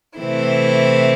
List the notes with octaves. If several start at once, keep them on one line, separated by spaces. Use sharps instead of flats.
C3 E3 A3 C4 E4